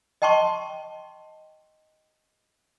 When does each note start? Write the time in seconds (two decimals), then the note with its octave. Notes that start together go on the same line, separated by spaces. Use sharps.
0.22 D#5 G5 A5 C6 C#6